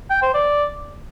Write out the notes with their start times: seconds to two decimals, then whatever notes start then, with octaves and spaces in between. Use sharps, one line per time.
0.10 G5
0.22 C5
0.34 D5